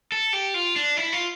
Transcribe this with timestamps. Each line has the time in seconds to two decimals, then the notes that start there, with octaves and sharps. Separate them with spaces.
0.12 A4
0.33 G4
0.54 F4
0.76 D4
0.97 E4
1.12 F4